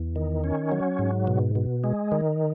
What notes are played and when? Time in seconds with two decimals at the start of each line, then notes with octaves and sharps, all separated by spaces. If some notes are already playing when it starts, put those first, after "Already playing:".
Already playing: E2
0.16 D#3
0.44 C#4
0.72 F#3
0.99 G#2
1.27 B2
1.55 B2
1.84 G#3
2.12 D#3